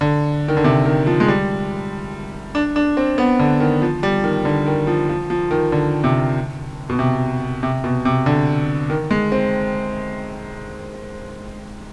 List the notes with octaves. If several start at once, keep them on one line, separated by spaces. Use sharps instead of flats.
D3
D#3
D3
C3
D#3
F3
G#3
G3
D4
D4
C4
B3
D3
D#3
F3
G3
D#3
D3
D#3
F3
F3
F3
D#3
D3
C3
B2
C3
C3
B2
C3
D3
D#3
G#3
C4